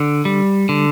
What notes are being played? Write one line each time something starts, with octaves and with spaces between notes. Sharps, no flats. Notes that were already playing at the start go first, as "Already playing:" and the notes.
Already playing: D3
G3
D3